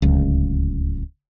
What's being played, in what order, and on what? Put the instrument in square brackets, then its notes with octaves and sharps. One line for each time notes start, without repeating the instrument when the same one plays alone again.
[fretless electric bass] D1 C#2